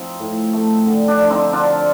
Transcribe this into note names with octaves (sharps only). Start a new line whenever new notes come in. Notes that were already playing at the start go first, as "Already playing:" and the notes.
Already playing: F3 C4 D#4
A2
A3
D3
D4
F3
C4 D#4
D3 D4 F4